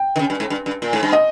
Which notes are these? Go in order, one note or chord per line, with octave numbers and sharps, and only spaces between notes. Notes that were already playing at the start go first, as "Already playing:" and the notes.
Already playing: G5
D#3
C#3
G2
G#2
G2
G2
A#2
G#2
G2
D#5